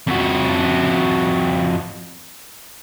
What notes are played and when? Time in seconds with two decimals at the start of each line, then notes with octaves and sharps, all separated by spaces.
0.07 F2 F#4